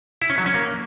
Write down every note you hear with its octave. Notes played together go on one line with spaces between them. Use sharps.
E4
C#4
F#3
C#4
A#3